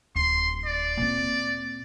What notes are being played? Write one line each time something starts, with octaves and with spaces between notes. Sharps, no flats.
D1 C6
D5
A#2 C4